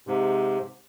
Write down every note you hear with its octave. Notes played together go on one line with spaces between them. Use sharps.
G#2 C3